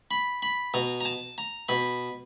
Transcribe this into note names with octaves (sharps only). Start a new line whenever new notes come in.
B5
B5
B2 A#5
A#5
A5
A#5
B2 B5